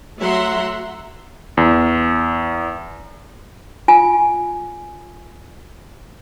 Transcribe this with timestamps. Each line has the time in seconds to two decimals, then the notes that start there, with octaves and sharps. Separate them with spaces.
0.20 F#3 A3 E5 F#5 A#5 C6
1.57 E2
3.88 F4 G#5